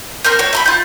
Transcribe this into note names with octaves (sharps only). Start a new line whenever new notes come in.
C4 A#4 F6 G6
F#4 C#5
E5 A#5 B5
F4 G6